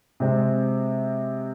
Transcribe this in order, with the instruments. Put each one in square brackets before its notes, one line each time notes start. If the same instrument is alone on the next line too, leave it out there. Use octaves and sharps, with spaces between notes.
[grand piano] C3 G#3 C4